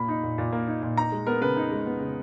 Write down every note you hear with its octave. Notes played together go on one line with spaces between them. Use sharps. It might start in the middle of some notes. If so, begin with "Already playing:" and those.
Already playing: A#2 A#3 B5
D#4
A#2
A#2
A#3
D#4
A#2
D#4 A#5
G#3
B3 A#4
C#3 B4
D#4
G#3
B3
C#3